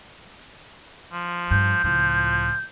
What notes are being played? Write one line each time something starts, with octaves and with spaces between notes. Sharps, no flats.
F3
G2 G6
C#2 A2 F3